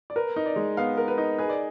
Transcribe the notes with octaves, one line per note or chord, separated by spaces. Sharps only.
D5
A#4 B4
D#4
D5
G#3
B3 F5
A#4
B4
D#4
G#4 B4
D5